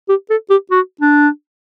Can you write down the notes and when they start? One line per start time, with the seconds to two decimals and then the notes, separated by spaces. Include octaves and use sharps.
0.09 G4
0.30 A4
0.50 G4
0.71 F#4
1.01 D4